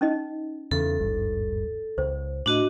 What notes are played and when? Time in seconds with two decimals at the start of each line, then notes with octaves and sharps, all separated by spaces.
0.01 C#4 D#4 D#5
0.71 E2 C#3 A4
0.99 D#1 G#1 G2
1.98 C#2 C5
2.46 A2 D4 F#4 D#5